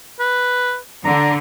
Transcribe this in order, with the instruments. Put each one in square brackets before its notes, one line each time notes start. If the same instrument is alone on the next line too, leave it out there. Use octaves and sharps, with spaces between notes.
[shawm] B4
[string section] D3 [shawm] A#5